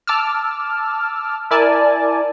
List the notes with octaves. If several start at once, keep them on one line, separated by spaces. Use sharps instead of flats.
A5 D6 E6 F6
E4 A#4 D5 G#5 A5